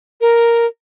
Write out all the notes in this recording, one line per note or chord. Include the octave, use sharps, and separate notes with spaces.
A#4